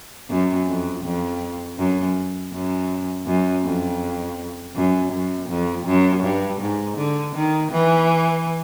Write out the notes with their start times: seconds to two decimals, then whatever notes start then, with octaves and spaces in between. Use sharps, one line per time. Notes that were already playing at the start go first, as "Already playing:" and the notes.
0.30 F#2
0.68 F2
1.04 F2
1.79 F#2
2.53 F#2
3.26 F#2
3.64 F2
4.76 F#2
5.13 F#2
5.49 F2
5.86 F#2
6.23 G2
6.61 G#2
6.98 D3
7.35 D#3
7.72 E3